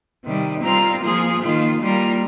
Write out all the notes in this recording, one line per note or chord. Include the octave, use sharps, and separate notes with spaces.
C3 D#3 G3
G3 C4 F4 A#4
F3 A#3 F4 G#4
D#3 A#3 F4
G3 A#3 F4 A#4